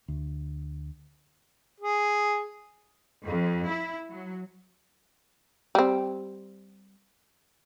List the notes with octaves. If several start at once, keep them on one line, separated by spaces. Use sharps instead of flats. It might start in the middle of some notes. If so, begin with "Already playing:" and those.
D2
G#4
F2
E4
F#3
G3 C4